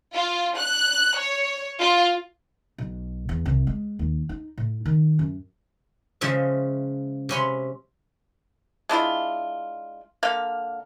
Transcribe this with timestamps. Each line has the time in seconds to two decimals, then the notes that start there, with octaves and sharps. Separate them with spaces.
0.14 F4
0.57 F#6
1.17 C#5
1.80 F4
2.78 B1
3.29 E2
3.46 C2
3.67 G#3
3.99 D#2
4.29 D#4
4.58 A2
4.85 D#3
5.19 F#2
6.21 C#3 F3 G#3 E5
7.29 C3 C#4 B5 C6
8.89 G#3 D4 E4 F4
10.23 D3 A#3 F5